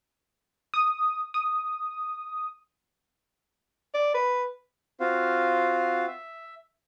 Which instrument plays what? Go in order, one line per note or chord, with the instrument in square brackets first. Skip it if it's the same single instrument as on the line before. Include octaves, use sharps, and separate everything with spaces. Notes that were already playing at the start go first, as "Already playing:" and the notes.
[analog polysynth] D#6
D#6
[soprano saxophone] D5
B4
[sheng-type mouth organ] C4 F4 F#4 C5 F5
E5